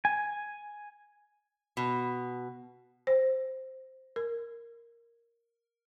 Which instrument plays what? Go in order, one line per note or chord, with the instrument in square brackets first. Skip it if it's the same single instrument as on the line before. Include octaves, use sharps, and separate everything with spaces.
[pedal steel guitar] G#5
[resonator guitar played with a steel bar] B2
[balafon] C5
A#4